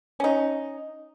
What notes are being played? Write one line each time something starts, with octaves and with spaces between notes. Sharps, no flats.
C#4 D#4